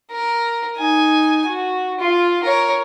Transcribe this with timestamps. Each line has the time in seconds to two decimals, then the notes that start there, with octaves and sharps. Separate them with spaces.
0.10 A#4
0.77 D#4 G#5
1.47 F#4
2.00 F4
2.43 A#4 C#5